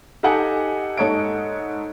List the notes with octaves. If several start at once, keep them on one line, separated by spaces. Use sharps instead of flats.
D#4 G4 A4 D#5 F#5 G#5
G#2 A4 C#5 D#5 D7